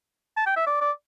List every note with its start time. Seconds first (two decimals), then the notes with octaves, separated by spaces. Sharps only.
0.37 A5
0.46 G5
0.56 E5
0.66 D5
0.81 D5